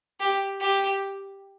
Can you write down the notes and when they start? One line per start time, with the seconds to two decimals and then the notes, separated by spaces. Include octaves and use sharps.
0.20 G4
0.61 G4